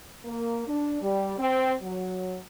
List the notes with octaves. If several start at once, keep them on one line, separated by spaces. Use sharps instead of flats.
A#3
D4
G3
C4
F#3